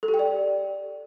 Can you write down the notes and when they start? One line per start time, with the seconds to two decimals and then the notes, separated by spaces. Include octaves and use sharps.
0.03 A4
0.08 G4
0.14 G5
0.19 D5